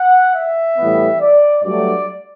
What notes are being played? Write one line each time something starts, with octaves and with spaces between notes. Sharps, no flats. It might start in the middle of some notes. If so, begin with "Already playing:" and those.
Already playing: F#5
E5
A2 E3 G3 B3
D5
G2 F#3 A3 D5